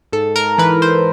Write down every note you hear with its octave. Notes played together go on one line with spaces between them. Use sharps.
G#2 A4
A#4
E3 B4
C5